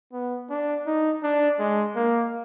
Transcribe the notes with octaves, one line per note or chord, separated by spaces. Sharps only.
B3
D4
D#4
D4
G#3
A#3